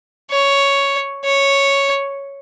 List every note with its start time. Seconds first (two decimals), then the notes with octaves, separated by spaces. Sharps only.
0.31 C#5
1.25 C#5